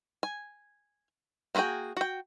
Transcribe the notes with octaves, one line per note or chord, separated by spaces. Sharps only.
G#5
A#3 C4 F#4 G#4 G5
F#4 G5